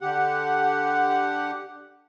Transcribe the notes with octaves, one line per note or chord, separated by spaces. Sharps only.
D3 G4 F#5